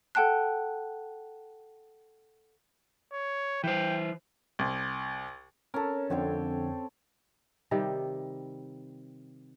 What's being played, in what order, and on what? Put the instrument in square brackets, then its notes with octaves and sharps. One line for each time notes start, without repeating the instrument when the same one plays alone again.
[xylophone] A4 F#5 G5 A5 F#6
[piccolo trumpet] C#5
[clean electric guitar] E3 C5 [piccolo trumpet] G5
[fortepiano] C2
[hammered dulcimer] C#4 A4 [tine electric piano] A#4
[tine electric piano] F2 D3 [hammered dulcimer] C4 C#5 G5
[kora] C3 D#3 G3